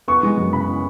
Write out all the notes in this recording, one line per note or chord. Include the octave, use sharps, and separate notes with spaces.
B3 C#6
G#3
F#2
C#3 B5
B3